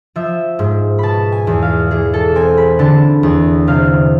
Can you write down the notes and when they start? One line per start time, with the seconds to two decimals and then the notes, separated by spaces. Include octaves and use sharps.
0.16 F3 E5
0.59 G#2
0.99 B2 A5 B5
1.32 G#5
1.47 E2
1.62 F5
1.91 E3 G#4
2.14 A4
2.35 C4 G#5
2.57 B5
2.79 D3 A5
3.23 E2
3.67 C3 F5